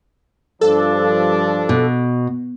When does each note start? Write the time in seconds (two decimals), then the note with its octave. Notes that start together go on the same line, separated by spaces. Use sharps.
0.61 G2 F3 D4 A4
1.69 B2